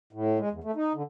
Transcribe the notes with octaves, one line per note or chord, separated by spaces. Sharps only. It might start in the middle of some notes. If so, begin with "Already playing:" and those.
A2
G#3
E2
A3
D#4
D3